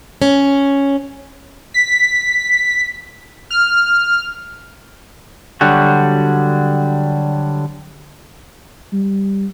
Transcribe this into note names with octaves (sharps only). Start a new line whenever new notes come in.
C#4
B6
F6
D3 F#3 G3 F#4
G3